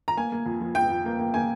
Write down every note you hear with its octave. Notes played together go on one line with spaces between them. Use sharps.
A#5
A#3 G#5
A#3
F2
F3
F2 G5
F2
A#3
A#3
A#3 G#5